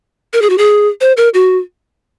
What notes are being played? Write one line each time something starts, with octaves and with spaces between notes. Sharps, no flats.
A#4
G#4
F#4
G#4
C5
A#4
F#4